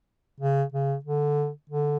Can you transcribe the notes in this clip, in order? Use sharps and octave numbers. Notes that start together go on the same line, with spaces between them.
C#3
C#3
D3
D3